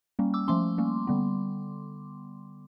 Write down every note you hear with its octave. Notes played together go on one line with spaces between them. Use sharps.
G3 A#3 C#4
D6 E6
F3 A3 C#4 C6 D6
G3 A#3 C#4
D3 G3 B3